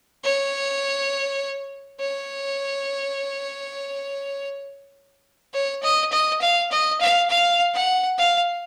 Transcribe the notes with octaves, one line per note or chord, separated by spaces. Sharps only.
C#5
C#5
C#5
D#5
D#5
F5
D#5
F5
F5
F#5
F5